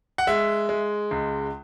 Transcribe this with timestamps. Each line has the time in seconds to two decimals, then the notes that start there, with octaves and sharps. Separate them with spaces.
0.18 F#5
0.27 G#3 E5
0.69 G#3
1.11 C#2